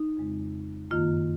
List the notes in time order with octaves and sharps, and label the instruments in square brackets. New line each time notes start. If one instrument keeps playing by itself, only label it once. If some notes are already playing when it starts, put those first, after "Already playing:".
Already playing: [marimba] D#4
F2 C#3 G#3 C4
F#2 D#3 A#3 F4